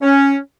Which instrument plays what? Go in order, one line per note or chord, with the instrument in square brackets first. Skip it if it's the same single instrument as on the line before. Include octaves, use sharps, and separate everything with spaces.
[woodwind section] C#4